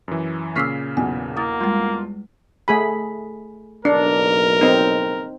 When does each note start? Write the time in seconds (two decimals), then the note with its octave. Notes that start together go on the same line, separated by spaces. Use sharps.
0.08 F#2 E3
0.56 A#2 C#3 C#6 D6 E6 F6 B6 C7
0.97 B1 E2 G#5
1.36 A#3 E4 D#6 A6
1.61 G3 G#3 F4
2.68 A3 G#4 B5
3.85 F#1 B1 D4 A#4
4.61 C4 D#4